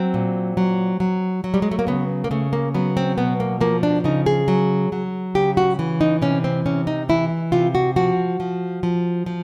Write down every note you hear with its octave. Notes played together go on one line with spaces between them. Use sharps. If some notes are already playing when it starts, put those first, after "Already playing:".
Already playing: F#3 C4
A#2
F#3
F#3
F#3
G3
G#3
A3
A#3
C#3 B3
A#3
C#3 A3
A#3
F#3 B3
C4
B2 B3
A#3
F3 A#3
D4
C#3 D#4
G#4
F#3
F#3
C#3 G4
F#4
E3
D#4
C3 C#4
C4
C3 C#4
D#4
E3 E4
C3 F4
F#4
F3 F#4
F3
F3
F3